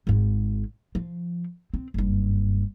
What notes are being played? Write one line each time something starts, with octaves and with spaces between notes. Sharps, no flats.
G#1 G#2
F3
C4
F#1 G2